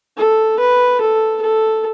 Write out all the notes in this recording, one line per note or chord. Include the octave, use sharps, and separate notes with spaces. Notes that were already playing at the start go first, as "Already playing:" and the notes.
A4
B4
A4
A4